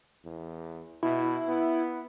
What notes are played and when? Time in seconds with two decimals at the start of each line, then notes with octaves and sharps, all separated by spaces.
0.25 E2
1.03 B2 E4
1.48 B3